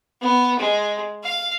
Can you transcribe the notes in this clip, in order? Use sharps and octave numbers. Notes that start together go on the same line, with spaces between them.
B3
G#3
F5